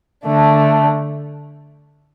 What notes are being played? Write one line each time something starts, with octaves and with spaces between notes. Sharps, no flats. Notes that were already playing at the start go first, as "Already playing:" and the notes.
D3 A3 D4